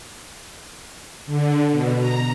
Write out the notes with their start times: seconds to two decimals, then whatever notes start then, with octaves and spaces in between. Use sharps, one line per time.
1.26 D3
1.71 B2
1.99 A#5